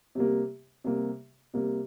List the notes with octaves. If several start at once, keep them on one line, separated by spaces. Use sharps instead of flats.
C3 G3 A#3
C3 G3 A#3
C3 G3 A#3